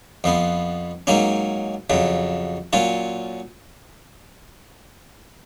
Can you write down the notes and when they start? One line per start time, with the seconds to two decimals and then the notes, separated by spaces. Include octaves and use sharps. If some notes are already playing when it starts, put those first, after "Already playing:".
0.24 F2 F3 B3
1.07 G#2 F#3 A#3 C#4
1.90 F2 C#3 F#3
2.73 A#2 F#3 C#4 F4